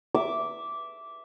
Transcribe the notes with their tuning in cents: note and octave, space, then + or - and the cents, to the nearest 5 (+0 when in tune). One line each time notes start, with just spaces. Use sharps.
E5 +0 D6 -10